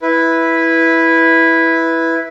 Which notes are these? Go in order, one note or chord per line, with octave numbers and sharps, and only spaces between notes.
E4 B4